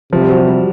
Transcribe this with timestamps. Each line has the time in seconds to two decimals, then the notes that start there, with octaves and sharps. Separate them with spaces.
0.13 C3 F3
0.21 G3
0.30 F#3
0.48 G3